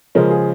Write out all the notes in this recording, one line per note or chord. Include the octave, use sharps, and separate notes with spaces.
C#3 F3 G#3 C#4 A#4
G#4